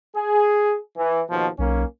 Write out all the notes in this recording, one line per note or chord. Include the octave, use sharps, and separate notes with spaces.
G#4
E3
D#2 B2 F3
B1 A#3 C#4